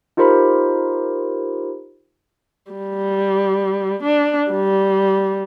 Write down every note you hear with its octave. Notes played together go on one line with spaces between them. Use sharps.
D#4 F4 G4 A#4 C5 B5
G3
D4
G3